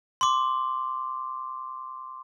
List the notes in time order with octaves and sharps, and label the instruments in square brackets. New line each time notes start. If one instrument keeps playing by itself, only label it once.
[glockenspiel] C6 D6